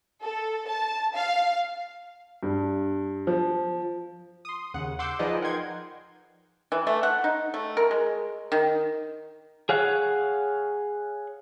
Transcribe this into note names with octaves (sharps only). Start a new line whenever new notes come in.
A4
A5
F5
G2
F3
C6 D#6
D#2 C#3 F#5
F#5 C6 D6 E6 G6
F3 D#4 G#4 B4 D5 D#5
A#4 F#5 G5 C6 G#6
E3
A3
F#5
D#4
A3
A#4
G#3
D#3
G#4 C#5 F5 F#5